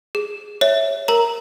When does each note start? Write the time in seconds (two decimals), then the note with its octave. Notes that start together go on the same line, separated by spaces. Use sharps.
0.15 G#4
0.61 C#5 E5
1.08 A#4 A#5